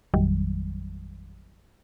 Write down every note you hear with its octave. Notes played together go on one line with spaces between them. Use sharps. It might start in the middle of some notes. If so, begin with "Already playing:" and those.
A1 F2 D#3 F#3 G3